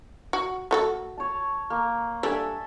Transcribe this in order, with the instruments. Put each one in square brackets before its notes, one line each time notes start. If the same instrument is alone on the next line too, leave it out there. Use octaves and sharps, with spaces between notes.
[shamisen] F#4
A3 F#4 A4
[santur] C#5 A5
A#3
[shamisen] G3 D4 [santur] A4 E5 G#5